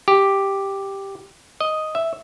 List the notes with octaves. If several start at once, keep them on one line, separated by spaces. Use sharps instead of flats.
G4
D#5
E5